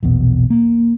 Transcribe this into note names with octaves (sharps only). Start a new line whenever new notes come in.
A#1 E2 B2
A#3